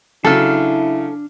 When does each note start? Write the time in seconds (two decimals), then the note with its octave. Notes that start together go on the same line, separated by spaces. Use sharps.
0.25 C#3 F#3 D4 E4 A4 F6